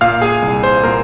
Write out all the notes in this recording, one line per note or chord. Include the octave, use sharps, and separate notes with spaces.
A#2 F5 F6
G#4 G#5
C2
C5
A#2 A#4